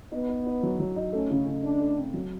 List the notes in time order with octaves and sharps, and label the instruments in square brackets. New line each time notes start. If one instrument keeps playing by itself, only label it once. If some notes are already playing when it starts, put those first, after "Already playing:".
[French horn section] B3 [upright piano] D#4
[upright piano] D#4
D#4
F#3
F#3
D#4
[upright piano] A3 [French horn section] C#4
[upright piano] C#3
C#3
[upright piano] A3 [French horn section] D4
[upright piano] A3
C4
F#3